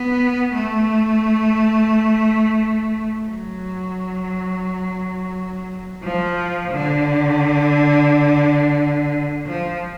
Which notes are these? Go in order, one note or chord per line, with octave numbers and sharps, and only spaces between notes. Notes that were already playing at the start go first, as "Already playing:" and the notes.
Already playing: B3
A3
F#3
F3
D3
F3